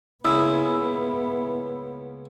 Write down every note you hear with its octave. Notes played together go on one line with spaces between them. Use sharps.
C#2 C#3 A#3 B3 E4 D#6 E6